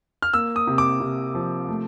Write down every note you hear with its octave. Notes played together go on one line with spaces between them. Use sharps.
F6
A#3 E6
D#6
C3
D6
C3
F3
A3